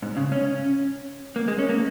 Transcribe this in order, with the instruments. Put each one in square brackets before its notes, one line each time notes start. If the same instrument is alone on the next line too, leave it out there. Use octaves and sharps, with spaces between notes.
[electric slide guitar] G#2
C#3
C#4
A#3
G#3
C#4
A#3